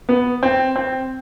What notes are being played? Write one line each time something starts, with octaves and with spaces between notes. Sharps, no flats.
B3
C4
C4